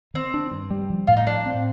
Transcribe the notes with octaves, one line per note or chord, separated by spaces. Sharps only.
D#3 C4
D4
G2
G3
F3
A2 F4
D#4
A2 D4
C4